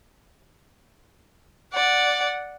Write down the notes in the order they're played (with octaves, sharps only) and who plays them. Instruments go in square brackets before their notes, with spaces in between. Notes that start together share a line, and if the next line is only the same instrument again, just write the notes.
[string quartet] D5 F#5